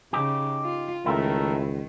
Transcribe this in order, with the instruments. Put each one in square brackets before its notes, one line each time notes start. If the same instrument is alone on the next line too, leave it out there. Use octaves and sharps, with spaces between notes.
[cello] C#3 [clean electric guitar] D#4 G4
[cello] F4
[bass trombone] C#2 [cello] D#3 [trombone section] A3 A#4 [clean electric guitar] E4 G5